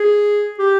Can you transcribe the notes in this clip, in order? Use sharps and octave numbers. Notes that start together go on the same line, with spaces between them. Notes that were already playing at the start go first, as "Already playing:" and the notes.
Already playing: G#4
G4